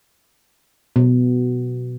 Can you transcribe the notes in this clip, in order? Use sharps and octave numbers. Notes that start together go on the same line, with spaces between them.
B2